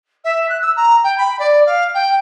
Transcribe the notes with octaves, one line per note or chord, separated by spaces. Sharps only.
E5
F#6
E6
A#5
G5
B5
D5
F5
G5